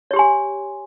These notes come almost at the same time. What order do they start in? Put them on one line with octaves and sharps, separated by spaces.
C#5 G4 C6 G#5